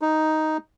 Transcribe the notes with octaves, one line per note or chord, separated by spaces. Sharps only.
D#4